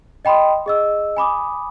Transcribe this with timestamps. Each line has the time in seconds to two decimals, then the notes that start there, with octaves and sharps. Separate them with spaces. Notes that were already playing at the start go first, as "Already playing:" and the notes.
0.25 D#5 G5 B5 C6 D#6
0.66 G#4 D#5 E6
1.17 G#5 B5 D6 D#6